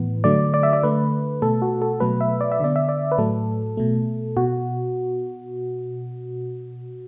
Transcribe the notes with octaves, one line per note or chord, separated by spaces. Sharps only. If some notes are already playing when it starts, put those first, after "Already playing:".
Already playing: A2 E3 B3
D3 F#3 A3 D5
D5
E5
D5
D3 A3 B4
B2 A3 A4
F#4
A4
B2 F#3 A3 B4
E5
D5
E5
D3 B3 D5
E5
D5
B4
A2 F#3 A3 A4
B2 A3
B2 F#4